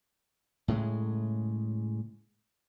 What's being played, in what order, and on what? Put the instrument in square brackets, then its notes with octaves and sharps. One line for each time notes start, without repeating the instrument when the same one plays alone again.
[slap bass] A2 C#3 G#3